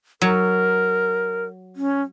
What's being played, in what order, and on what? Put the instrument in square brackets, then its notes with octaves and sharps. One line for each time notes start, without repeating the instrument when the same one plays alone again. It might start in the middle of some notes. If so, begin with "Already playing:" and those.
[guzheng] F#3 [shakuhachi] A#4
[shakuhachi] C#4